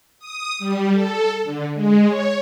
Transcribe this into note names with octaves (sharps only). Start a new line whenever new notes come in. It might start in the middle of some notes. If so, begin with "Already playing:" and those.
D#6
G3
A4
D3
G#3
C#5